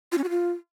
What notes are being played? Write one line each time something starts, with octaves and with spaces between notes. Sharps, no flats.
F4
C#4
F#4
F4